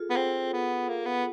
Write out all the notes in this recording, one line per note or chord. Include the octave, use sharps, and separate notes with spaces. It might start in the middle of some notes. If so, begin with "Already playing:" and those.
Already playing: F4 G#4 A4
B3
C4
B3
A#3
B3